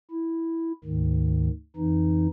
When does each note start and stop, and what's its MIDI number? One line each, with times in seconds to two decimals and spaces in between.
0.11 0.72 64
0.84 1.49 38
0.84 1.49 44
0.84 1.49 51
1.76 2.27 41
1.76 2.27 52
1.76 2.27 63